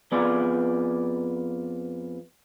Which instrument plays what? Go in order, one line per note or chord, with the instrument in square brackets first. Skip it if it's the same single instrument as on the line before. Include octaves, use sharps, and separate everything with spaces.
[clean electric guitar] F2 B3 F4 G#4 D5